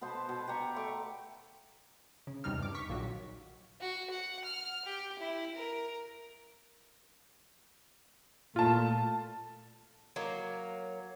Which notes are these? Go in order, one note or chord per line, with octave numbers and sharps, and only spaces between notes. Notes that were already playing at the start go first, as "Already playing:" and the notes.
B2 B3 C5 A5
B2
G4 B4 A#5 C#6
A3 C#6 D6
C#3
E2 C3 G3 D#4 F6
G2 D6
C#6 B6
A#1 A#2 D#3 F#3
F#4
F#5
F6
G4
E4
A#4
A#2 A3 F4 A5
F#3 A#3